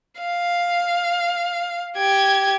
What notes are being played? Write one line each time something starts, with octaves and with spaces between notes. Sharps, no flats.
F5
G4 G#6